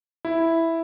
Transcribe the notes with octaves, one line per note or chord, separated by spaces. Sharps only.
E4